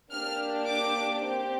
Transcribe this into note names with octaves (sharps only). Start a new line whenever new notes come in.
A#3 D4 G4 F6
D6
C4 G4